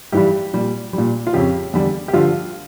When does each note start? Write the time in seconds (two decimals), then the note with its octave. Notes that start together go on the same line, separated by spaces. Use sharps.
0.12 G2 E3 G3 G4
0.53 A#2 G3
0.93 A#2 G3
1.27 F4
1.33 F2 C#3 F3 G4
1.73 E2 D3 G3
2.08 G4
2.13 G2 D3 F3 F4